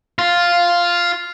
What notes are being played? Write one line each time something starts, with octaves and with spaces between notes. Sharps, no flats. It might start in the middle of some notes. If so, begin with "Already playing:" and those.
F4